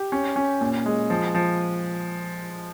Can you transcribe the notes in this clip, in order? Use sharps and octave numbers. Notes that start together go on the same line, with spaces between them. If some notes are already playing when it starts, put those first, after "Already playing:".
Already playing: G4
C#4
C#4
A#2
G#3
F3
F3